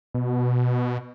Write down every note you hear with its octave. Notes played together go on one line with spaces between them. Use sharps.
B2